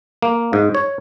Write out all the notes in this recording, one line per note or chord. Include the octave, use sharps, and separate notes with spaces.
A#3
G#2
C#5